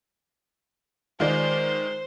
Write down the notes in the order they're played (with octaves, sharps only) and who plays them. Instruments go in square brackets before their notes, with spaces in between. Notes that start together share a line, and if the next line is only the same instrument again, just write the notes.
[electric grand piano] D#3 G#3 [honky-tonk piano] F4 D5 [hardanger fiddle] C5 C6